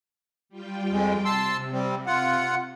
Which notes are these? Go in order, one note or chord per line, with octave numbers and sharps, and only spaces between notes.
G3 F4 G5
F2 G#3
C3 A5 C6 E6
G3 C4
F4 F#5